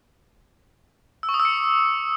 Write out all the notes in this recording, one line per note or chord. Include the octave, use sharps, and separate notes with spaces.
E6
C#6
D#6
E6
C#7